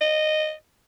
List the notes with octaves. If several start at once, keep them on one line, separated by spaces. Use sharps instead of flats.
D#5